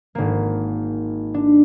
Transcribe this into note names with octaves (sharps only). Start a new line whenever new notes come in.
G#1 A#3
D4